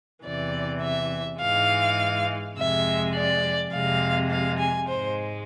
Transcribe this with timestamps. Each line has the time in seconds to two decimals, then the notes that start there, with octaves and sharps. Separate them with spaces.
0.24 E2 C3 E3 D5
0.82 E5
1.41 G#2 E3 G#3 F5
2.57 F2 C3 G#3 E5
3.14 D5
3.72 F2 C3 G#3 F5
4.30 F5
4.59 G#5
4.88 G#2 G#3 C5